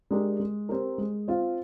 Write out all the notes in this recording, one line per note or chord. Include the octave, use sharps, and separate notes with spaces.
G#3 D4 G4 A#4
G#3
C4 G4 A#4
G#3
C4 F4